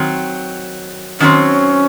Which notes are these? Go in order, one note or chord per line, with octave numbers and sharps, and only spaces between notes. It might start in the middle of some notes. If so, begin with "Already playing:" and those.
Already playing: D#3 F#3 C4
D#3 F#3 C4 C#4